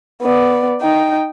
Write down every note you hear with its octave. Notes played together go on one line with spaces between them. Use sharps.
B3 D5
D#4 G5